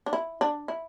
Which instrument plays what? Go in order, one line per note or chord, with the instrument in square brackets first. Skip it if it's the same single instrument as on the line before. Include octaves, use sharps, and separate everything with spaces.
[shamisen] D4
E4
D4
E4